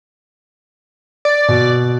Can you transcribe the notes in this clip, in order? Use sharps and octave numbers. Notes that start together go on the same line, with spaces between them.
D5
B2